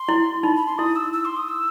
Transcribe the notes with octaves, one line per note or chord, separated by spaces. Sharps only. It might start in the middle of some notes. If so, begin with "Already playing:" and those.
Already playing: C6
E4
D#4 B5
B5
C6
E4 D#6
E6
E6
C6
D#6
E6